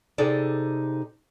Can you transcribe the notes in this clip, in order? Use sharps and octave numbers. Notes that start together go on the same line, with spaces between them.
C3 D#4 G#4 A4 D5